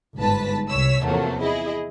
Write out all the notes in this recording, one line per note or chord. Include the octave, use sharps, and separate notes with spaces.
G1 G#2 B4 A5 B6
C2 C#5 E6 B6
E2 C3 F3 F#3 A3 A#3
E4 G#4 D#5